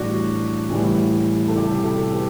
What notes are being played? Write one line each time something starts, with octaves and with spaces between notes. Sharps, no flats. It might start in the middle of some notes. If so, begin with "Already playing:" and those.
Already playing: A2 E3 G3 D4 F#4
A2 E3 G3
A4
C3 G3 E4 G4
G4
F#4 A4
G4 B4